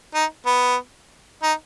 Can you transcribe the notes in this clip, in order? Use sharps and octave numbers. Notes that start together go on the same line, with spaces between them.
D#4
B3
D#4